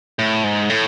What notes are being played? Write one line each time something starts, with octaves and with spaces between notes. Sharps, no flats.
A2
G#2
A2